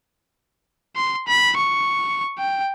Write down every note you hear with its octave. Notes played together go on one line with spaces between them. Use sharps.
C6
B5
C#6
G5